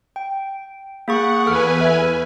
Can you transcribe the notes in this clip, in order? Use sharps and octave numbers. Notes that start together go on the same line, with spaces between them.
G5
A#3 G#4 F#5 C#6
E2 A4 B4 G#5 F6
E5